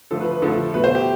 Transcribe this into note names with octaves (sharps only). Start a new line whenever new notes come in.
D3 F3 A3 A4
B4
B4
D3 F3 A3 A4
B2 A3 B4
C5
G4